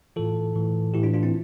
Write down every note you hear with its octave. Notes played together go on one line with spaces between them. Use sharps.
A2 E3 F4 A4
A2 E3
A2 E3 E4 G4
D4 F4
D4 F4
C4 E4